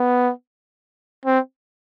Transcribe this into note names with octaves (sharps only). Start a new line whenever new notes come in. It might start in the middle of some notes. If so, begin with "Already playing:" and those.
Already playing: B3
C4